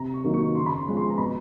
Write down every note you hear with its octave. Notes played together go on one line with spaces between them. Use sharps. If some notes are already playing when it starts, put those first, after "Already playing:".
Already playing: C3 A#5
C#6
D#3 F#3 A#3
C#6
C#3 C6
B5
C6
F3 G#3 B3
C6
A#5
B2 B5